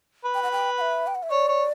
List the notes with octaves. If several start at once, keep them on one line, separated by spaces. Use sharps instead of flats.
B4
G5
F#5
G5
F#5
E5
G5
F#5
E5
C#5 D5
C#5